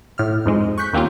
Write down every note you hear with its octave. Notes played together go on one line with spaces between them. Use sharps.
A2 F6
F2 G#2 G#3
C#6 F#6 G6 B6
D#2 A#3 C4 C#4 F4